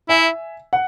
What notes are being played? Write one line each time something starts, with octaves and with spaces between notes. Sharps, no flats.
E4 E5 G#5
F#5